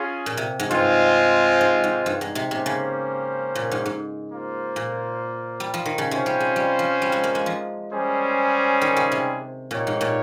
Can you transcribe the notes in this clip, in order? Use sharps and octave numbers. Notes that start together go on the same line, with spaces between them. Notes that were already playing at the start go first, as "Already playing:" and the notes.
Already playing: C#4 F4 G#4
A#2
C3
G#2
G2 G#3 C4 F4 C5
G#2
G#2
G2
G#2
C3
C3 A#3 C#4 G4 C5
C#3
A#2
G#2
G#2
A#3 F4 C5
A#2
G3
F3
D#3
C#3
C3 C#4 F4 C5
G3
G#3
G3
F3
G3
G#3
A#3
G#3
F3
G3 C#4 G#4 C5
D#3
C#3
C3
A#2 D#4 G4 C#5 F5
G#2
A#2